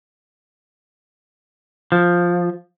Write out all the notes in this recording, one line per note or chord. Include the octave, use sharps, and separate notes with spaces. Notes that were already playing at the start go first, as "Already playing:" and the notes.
F3